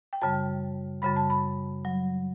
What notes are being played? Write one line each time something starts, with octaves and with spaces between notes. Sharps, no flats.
G5
F#2 C#3 G3 A5
F#2 C#3 G3 B5
A5
B5
F#3